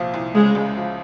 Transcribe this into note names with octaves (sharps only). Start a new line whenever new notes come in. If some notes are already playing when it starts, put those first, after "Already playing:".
Already playing: C2 A#2 F3
C2
C#3 G#3
C#2
F3